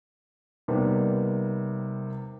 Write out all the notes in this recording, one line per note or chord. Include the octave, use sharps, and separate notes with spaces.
C3 D#3 G3 A#3 B3